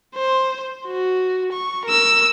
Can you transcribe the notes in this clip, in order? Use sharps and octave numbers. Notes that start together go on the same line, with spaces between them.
C5
F#4
C#6
A#4 E6